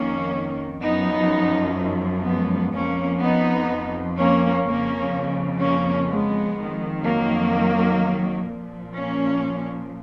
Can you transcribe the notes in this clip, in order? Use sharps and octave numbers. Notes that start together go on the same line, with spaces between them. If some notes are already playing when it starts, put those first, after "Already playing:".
Already playing: F2 D#3 A#3 C#4
F#2 F3 B3 D#4
G#3 B3
F2 F3 A#3 C#4
B3 D#4
A#3 C#4
F2 C#3 F3 A#3 C#4
A#3 C#4
G#3 B3
F2 D#3
F#3 A#3
A#2 F3
A#3 C#4